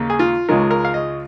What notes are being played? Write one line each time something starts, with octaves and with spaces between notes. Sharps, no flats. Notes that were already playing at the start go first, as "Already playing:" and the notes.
Already playing: D#2 C#3 A#3
G#4
F4
C#2 C#3 G#3 F4 A#4
A#4
F5
D#5